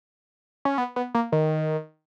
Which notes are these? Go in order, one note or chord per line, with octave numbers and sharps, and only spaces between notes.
C#4
B3
B3
A#3
D#3